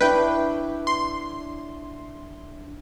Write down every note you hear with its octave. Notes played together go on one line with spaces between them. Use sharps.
D4 E4 B4 C#5 G5
C6